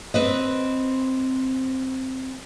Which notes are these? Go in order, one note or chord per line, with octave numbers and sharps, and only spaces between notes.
C4 B4 D#5